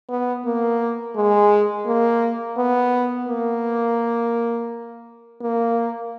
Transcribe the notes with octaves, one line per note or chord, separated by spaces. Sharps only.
B3
A#3
G#3
A#3
B3
A#3
A#3